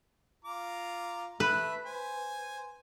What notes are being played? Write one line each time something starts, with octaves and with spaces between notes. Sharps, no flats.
F4 A#5 D6
A3 B4 E5
C5 G#5